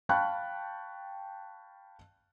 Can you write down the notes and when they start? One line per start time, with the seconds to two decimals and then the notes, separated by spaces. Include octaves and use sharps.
0.09 F5 G5 A5 B5 C#6 F#6